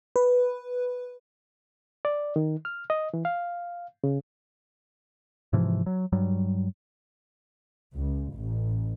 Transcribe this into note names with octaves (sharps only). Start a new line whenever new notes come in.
B4
D5
D#3
F6
D#5
E3
F5
C#3
G#2 C3 E3 F3
F#3
G2 F#3 G3
C#2
A1